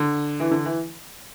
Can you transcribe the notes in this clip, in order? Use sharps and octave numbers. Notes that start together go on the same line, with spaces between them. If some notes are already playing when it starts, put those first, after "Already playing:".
Already playing: D3
E3
D3
E3